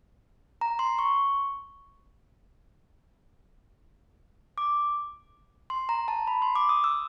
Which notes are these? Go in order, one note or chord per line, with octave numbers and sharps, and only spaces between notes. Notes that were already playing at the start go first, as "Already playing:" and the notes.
A#5
C6
C#6
D6
C6
A#5
A5
B5
C6
D6
D#6
E6